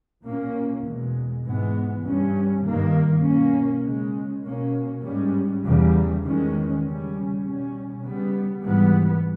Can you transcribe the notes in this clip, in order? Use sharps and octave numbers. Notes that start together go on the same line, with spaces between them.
A#2 A#3 C#4
E2 B2 G#3
G#2 E3 G#3 B3
G2 G3 C#4
G2 D#3 A#3
B2 A#3 C#4
C#3 G#3 C#4
B2 A#3 C#4
G#2 G3 C#4
E2 C#3 G3
E2 D#3 G#3 C#4
C#3 G3 C#4
B2 G3 C#4
C#3 G3 B3
G#2 E3 G3 B3